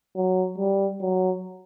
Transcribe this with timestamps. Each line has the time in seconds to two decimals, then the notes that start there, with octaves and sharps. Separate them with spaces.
0.16 F#3
0.58 G3
1.01 F#3